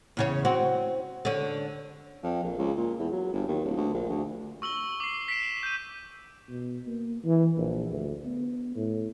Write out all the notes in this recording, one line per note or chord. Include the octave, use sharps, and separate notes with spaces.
E2 C#3 C#5
C4 F#4
D3 C#4
F2
A#1
C#2
A#2
E2
F#3
G1
D#2
D1
D2
A#1
D2
C#6 E6 F#7 G7
D6 C7
B6 C7 D7 E7
G6 D#7
B2
A#3
E3
A#1
D2
B3
A2